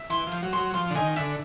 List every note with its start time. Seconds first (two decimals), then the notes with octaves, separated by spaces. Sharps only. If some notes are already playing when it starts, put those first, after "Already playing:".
Already playing: E5
0.10 E3 C6
0.27 F3
0.32 C5
0.42 F#3
0.53 F#3 C6
0.74 F3 C6
0.90 D3
0.95 D#3 G#5
1.16 D3 E5